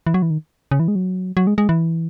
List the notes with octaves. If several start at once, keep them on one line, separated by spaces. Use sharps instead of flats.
E3
F#3
E3
D#3
C#3
E3
G#3
F#3
F#3
G#3
G#3
E3